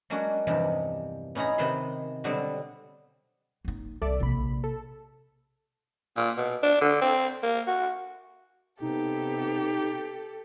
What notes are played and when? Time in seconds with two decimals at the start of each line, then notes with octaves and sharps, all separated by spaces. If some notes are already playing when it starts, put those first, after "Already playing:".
0.10 F#3 G#3 A#3 C#4 D4 F#4
0.47 E2 G2 C3 F3 D#4
1.35 B3 C#4 D#4 E4 G#4 A#5
1.58 C3 D#3 B4 D#5 B5 C6
2.24 B2 D3 F#3 G3 B3 C4
3.65 F#1 D#4
4.02 C2 A4 D5 E5
4.20 A#1 C3 A#3 B5
4.64 A4
6.17 A#2
6.37 B2
6.63 D4
6.81 D3
7.01 C4
7.43 A#3
7.67 F#4
8.81 C3 B3 D#4 G4 A4